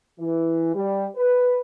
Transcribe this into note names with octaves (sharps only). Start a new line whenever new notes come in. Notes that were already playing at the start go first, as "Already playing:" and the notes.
E3
G3
B4